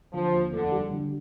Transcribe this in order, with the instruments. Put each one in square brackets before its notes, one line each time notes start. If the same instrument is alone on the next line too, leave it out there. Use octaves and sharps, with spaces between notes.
[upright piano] D3 [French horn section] F3
[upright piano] D#2
[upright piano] F1 [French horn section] D3
[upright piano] G3
D3